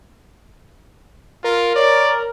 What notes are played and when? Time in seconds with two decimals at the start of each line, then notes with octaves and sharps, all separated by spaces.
1.44 F4 A#4
1.76 C#5 D5